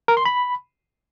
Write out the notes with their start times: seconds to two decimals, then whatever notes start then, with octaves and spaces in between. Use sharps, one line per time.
0.08 A#4
0.17 C6
0.25 B5